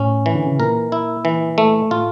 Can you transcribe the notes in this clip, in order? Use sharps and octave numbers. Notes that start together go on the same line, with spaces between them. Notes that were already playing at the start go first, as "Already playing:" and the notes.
Already playing: A2 C#4
E3
D3
C#3
A#2 A#4
E4
E3
A3
A2 F4